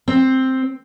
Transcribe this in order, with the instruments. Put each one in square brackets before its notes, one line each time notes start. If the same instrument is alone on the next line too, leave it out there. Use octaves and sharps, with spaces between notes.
[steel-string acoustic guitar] C4